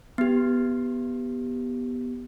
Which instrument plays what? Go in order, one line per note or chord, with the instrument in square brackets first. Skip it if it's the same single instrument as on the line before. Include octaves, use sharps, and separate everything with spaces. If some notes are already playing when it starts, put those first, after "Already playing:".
[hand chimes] B3 G4